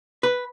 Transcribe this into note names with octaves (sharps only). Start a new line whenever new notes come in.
B4